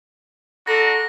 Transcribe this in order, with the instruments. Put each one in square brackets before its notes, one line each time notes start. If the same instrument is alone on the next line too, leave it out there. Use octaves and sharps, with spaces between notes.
[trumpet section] D4 F#4 A#5 [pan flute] A4 [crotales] A#6